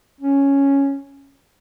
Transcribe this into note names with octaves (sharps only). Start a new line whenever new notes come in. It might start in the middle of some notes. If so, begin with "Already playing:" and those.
C#4